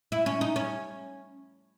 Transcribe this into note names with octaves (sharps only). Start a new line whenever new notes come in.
E4
C#4
D#4
C#4